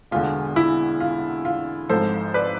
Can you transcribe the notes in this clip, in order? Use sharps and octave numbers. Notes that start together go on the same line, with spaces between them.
E1 E2 D3 F4
E4
F4
F4
G#1 G#2 F3 A4 C5
B4 D5